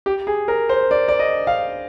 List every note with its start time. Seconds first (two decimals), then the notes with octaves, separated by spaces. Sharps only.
0.06 G4
0.27 G#4
0.48 A#4
0.69 C5
0.91 D5
1.08 D5
1.19 D#5
1.47 F5